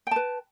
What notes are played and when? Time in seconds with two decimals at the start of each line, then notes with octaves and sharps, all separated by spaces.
0.07 G5
0.11 A5
0.16 B4